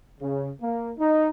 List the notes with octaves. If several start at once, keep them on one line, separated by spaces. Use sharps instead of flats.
C#3
A#3
D#4